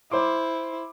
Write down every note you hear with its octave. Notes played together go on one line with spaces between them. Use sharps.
E4 C5 C6 D6